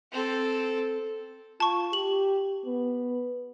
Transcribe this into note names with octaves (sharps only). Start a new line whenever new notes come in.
C4 A4
F4 A5 C#6
G4 F#7
B3